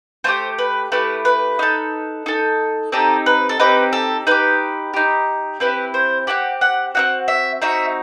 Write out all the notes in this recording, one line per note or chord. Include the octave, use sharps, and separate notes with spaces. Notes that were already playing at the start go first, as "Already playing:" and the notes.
A3 E4 G4 C5
B4
A3 E4 G4 B4
B4
D#4 A4
D#4 A4
C4 D#4 G4 A4
B4
A4
C4 D#4 G4 B4
A4
D#4 G4 B4
D#4 G4
C4 E4 G4 B4
C5
C4 E4 G4 F#5
F#5
C4 D#4 F#4 F#5
E5
C4 D#4 F#4 E5